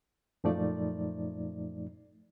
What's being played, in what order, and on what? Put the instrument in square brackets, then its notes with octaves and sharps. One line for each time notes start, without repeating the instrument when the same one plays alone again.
[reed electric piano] F#2 A#2 F3 A3 D#4 D5